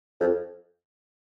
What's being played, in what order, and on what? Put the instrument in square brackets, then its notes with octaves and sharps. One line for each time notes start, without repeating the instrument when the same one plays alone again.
[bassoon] F2